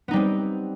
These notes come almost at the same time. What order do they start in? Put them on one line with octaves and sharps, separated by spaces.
B3 D#4 G3 C4